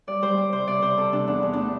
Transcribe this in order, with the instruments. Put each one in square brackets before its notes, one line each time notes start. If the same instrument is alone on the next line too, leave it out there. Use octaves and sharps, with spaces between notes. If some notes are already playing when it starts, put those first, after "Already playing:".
[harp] G3 D5
G3 C5
G3 D5
C3 C5
C3 D5
C3 C5
C3 A4
C3 D4
E2 D4
E2
A3 D4